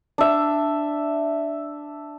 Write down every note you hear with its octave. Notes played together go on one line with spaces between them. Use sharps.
D4 E5